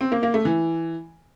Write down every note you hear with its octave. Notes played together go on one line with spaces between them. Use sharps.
C4
A#3
A#3
A3
E3